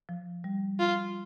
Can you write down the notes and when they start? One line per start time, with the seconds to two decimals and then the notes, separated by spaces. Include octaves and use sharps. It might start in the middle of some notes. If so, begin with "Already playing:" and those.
0.09 F3
0.44 G3
0.80 F4